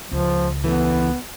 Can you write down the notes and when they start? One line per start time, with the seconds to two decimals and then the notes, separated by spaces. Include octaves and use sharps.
0.11 C#2 F3
0.64 E3 A3 B3 C#4